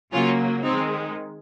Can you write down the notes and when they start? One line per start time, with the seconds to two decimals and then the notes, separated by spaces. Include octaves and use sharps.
0.12 C#3 F#3 A#3 C#4 F4
0.63 D#3 G#3 C4 D#4